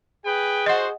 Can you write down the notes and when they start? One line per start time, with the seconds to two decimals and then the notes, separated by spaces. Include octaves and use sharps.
0.24 G#4 B4 G5
0.66 F#4 C5 D#5 F#5